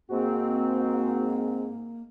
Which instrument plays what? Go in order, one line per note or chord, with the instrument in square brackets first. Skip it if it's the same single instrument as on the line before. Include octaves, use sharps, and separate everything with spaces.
[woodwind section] G#2 C4 [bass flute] A#3 [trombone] F#4